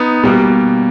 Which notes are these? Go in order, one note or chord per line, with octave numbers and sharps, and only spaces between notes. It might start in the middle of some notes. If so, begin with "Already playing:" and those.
Already playing: B3 D#4
B2 G3 A#3